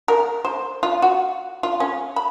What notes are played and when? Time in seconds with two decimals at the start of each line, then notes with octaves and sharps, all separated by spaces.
0.08 A#4
0.45 C5
0.83 F4
1.02 F#4
1.63 F4
1.80 C#4
2.16 B5